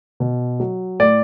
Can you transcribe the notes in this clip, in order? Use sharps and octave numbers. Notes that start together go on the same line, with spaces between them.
B2
F#3
A2 D5